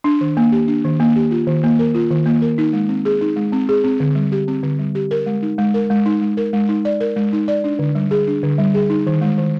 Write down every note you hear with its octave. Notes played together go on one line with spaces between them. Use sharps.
D4
D#3
A#3
G4
D4
D#3
A#3
G4
F4
D#3
A#3
A#4
F4
D#3
A#3
A#4
D#4
G#3
C4
G#4
D#4
G#3
C4
G#4
C4
D3
G3
G4
C4
D3
G3
G4
A#4
G#3
D#4
G#3
A#4
G#3
D#4
G#3
A#4
G#3
D#4
D5
A#4
G#3
D#4
D5
D4
D3
G3
G#4
D4
D3
G3
G#4
D#4
D#3
G#3
D#3